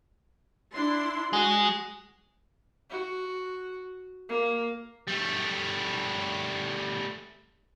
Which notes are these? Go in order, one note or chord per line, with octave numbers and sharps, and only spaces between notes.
D4 E4 C6
G#3 F#4
F#4
A#3
G3 A3